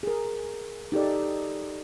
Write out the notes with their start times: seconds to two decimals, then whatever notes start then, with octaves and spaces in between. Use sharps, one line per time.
0.03 G#4 A#4
0.92 D#4 G4 A4 D5